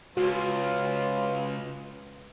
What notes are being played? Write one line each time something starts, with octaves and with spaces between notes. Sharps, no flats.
C#2 F4 F#4 B4